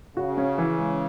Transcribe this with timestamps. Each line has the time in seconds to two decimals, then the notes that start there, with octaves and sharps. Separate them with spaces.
0.17 C#3 F#4
0.37 C#4
0.58 E3
0.78 G#3